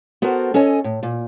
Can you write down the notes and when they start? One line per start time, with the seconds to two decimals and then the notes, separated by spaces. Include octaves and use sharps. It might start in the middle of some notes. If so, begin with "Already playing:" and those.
0.22 B3 F#4 A4 A#4 C5
0.54 C#4 A4 C#5 D#5 G#5
0.84 A2
1.03 A#2